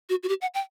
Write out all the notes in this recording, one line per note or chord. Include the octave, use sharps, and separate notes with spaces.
F#4
F#4
G4
F#5
G5